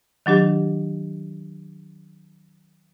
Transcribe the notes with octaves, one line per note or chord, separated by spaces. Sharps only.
D#3 F#3 D4 G4